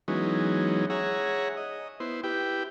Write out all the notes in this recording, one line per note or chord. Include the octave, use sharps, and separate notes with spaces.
E3 F#3 G#3 B3 C#4 D#4
G#4 C#5 E5 F#5 A#5
D#5
B3 E4 C5
E4 G4 B4 G5